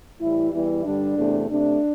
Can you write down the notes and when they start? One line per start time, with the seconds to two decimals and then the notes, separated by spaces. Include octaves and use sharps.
0.20 A2 E3 G3 E4
0.52 E2 E3 G3 E4
0.84 G2 D3 G3 D4
1.17 E2 C3 A3
1.50 C3 A3 D4